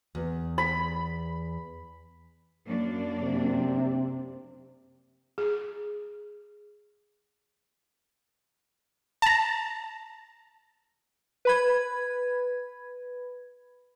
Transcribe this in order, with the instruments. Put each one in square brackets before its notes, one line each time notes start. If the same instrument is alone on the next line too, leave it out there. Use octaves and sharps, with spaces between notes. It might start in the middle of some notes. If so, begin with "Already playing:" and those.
[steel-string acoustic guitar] E2
[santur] B5
[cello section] F#2 A#3 D4
[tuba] C3
[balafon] G#4
[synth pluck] A5 A#5
[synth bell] B4 B5 G#6